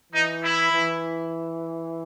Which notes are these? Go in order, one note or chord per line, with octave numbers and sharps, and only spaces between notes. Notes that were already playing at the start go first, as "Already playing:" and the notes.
E3 D#4
E4
E3